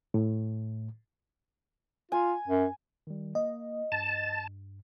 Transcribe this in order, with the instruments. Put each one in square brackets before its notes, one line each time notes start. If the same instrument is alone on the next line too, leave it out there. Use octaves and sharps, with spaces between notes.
[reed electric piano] A2
[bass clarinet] F4 [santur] G#5
[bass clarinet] F#2
[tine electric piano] D#3 G3
[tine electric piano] A#3 [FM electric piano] D#5
[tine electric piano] G2 [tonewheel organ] A5